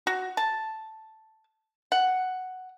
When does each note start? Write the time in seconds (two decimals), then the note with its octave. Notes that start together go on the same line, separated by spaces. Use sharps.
0.07 F#4
0.37 A5
1.92 F#5